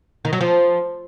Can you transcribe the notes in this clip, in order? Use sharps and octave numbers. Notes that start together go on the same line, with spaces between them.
D#3
F#3
F3